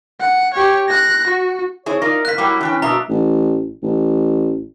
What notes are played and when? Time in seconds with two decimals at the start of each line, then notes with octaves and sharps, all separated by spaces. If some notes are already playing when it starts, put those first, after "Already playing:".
0.21 F#5
0.54 G4 C#5
0.89 F#6 A#6
1.27 F#4
1.86 C4 E4 G#4 C#5
2.02 D#4 F4 A#4 D5 A#6
2.25 G#2 A#3 F#6 B6
2.38 F#3 G3 A#3 E4 G5 D6
2.61 E3 C#4 D4 E4 G5
2.82 B2 A#3 D4 E5 A#5 D#6 E6
3.09 A1
3.83 A1